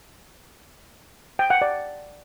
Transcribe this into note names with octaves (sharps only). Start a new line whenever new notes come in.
G5
F#5
D5